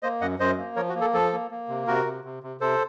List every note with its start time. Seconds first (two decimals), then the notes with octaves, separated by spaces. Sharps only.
0.03 A#3 C5 D#5
0.21 F#2 D#5 F#5
0.39 F#2 C5 D#5
0.58 A#3
0.76 F3 A#4 C#5
0.89 F#4
0.95 A#3
1.01 A4
1.14 F3 A4
1.33 A#3
1.51 A#3
1.69 C3
1.87 C3 F#4 A#4
2.06 C3
2.24 C3
2.43 C3
2.61 C3 A4 C5